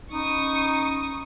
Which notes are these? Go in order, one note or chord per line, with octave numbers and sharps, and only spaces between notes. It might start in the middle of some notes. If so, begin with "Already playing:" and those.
C#4 D#4 B5 C#6 D#6